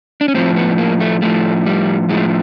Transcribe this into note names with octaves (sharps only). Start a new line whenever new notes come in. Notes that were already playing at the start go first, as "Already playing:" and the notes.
D4
C#4
A2 F3 C4
B3
A#3
A3
A2 F3 A3
G3
A2 F3 G#3